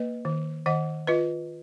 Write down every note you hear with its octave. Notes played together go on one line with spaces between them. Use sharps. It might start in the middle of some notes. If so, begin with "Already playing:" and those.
Already playing: A#3 B4 D#5
D#3
D#3 D#5 F#5
F4 B4 D#5